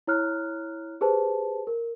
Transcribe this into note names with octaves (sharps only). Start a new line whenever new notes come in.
E4 C#5 A#5 F6 F#6
G4 G#4 B4 C5 A5
A#4